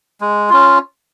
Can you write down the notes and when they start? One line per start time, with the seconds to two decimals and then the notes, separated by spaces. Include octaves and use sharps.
0.21 G#3
0.50 C#4 F4